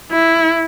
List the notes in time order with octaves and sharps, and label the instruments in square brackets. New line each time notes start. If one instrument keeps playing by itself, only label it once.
[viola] E4